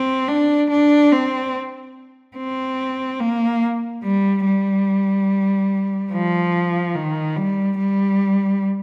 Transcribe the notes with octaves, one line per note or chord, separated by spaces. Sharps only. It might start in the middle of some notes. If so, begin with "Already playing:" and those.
Already playing: C4
D4
D4
C4
C4
A#3
G3
G3
F3
D#3
G3
G3